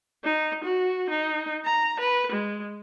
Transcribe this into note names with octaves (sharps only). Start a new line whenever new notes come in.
D#4
F#4
D#4
A#5
B4
G#3